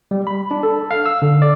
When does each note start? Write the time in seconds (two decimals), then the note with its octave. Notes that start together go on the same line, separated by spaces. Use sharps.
0.11 G3
0.27 B5
0.51 D4
0.63 A4
0.91 F5
1.06 E6
1.22 D3
1.42 D5